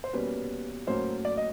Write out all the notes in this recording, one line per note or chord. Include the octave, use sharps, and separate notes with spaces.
C5
B2 G3 A#3 C#4 B4
A2 F#3 A#3 C#4 C5
D5
D#5